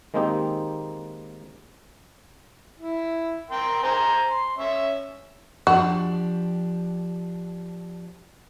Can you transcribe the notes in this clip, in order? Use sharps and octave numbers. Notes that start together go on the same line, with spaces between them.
D#3 G#3 A#3 C4 D#4 G4
E4
A#4 G5 C6
C5 G#5 A#5
C6
C#4 C#5 E5
F3 D4 F#4 G4